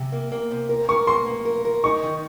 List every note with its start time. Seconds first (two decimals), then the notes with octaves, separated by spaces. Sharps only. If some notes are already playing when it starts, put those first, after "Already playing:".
Already playing: C3
0.12 A#3
0.32 A#3
0.51 C3
0.69 A#4
0.89 A#4 C#6
1.07 A#3 C6
1.26 A#3
1.45 A#4
1.65 A#4
1.84 D#4 C#6
2.03 D#3